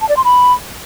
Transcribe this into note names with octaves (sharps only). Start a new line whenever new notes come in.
A5
D5
C6
B5